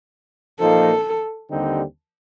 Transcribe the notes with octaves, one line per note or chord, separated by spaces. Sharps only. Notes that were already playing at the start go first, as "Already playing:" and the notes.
A#2 F3 A#3 D#4 A4
D#2 D3 G3 C4 D#4